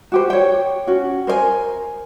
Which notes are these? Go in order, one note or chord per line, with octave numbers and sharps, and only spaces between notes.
F#4 G4 C5
C#5 G5
C#4 F#4
A#4 C5 D5 G#5